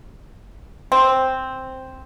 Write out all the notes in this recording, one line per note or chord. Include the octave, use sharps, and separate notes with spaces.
C4